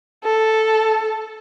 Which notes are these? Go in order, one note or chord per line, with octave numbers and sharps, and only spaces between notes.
A4